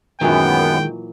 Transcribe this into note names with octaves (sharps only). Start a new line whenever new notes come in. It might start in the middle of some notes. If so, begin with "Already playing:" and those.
F#2 A#2 D#3 E3 F#3 G#3 B3 G5